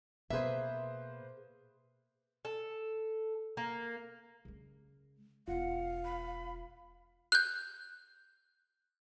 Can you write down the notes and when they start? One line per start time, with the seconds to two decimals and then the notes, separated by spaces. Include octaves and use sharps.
0.30 B2 A#3 G#4 B4 C5 E5
2.45 A4
3.57 A#3
4.45 C#3 G#3
5.48 E1 F4 F5 F#5
6.05 B5
7.32 F#6 G6